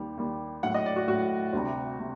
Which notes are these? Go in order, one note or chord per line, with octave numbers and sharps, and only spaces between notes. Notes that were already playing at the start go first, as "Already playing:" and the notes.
Already playing: D#2 D#3 G3
D#2 D#3 G3
A2 F#3 F#5
D#5
D5
F#4
A2 F#3 F#4
D2 C3 G3
C3 G3